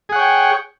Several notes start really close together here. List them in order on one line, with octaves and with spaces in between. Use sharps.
G#4 F#5 C#5 G5